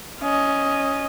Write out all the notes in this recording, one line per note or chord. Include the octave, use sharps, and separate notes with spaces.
C#4 D#5